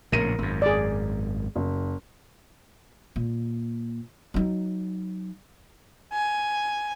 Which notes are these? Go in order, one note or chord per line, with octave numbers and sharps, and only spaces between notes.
A#1 A2 C#3 A#4 A#6 D#7
G#1 F#2
G#4 D5
F#1
A#2
F#3 D#4
G#5